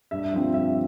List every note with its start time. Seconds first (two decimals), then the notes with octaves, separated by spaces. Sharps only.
0.11 G2 E5
0.33 F3 C4
0.53 G2 E5